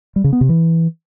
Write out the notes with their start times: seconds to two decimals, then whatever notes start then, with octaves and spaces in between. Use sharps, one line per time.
0.16 G3
0.24 C#3
0.33 B3
0.41 C3
0.49 E3